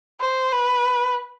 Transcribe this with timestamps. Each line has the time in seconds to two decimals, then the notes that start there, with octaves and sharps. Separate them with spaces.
0.21 C5
0.52 B4